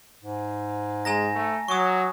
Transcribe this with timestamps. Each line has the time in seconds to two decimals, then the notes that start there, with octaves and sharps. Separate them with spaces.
0.22 G#2
1.05 G#3 G#5 A#5 A#6
1.35 A3
1.68 F#3 C#6 D#6